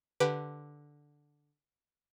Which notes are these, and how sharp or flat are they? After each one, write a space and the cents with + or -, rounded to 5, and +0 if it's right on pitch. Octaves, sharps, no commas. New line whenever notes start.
D3 +0 G4 +0 B4 +0